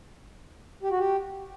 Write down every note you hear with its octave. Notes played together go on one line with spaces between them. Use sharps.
G4
F#4
G4